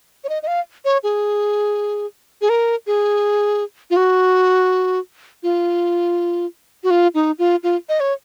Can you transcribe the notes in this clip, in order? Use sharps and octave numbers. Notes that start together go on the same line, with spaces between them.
C#5
D#5
D#5
F5
C#5
G#4
G#4
A#4
G#4
F4
F#4
F4
F#4
F4
D#4
F4
F4
D#5
C#5